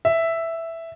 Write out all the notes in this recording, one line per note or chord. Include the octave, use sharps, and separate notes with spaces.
E5